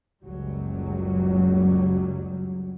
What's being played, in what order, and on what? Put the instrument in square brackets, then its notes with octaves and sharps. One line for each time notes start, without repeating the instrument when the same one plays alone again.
[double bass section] F#1 C#2 F#3 G3